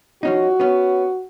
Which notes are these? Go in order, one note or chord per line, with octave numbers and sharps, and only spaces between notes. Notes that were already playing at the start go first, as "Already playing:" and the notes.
F3 C#4 D#4 F#4
B3 C#4